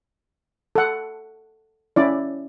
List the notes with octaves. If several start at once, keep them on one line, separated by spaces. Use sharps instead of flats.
A4 F#5
C#4 E4 D5